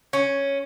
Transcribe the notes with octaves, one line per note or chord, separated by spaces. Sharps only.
C#4